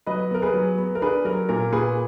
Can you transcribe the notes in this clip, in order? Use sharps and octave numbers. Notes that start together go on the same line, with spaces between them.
F#3 B4 D#5
B3 A#4
G#4 B4
F#3
B3
A#4
D4 G#4 B4
F#3 A#4
A#2 A#4
A#2 G#4 B4